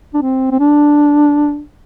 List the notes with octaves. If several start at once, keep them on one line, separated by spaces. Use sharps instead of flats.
D4
C4
C4
D4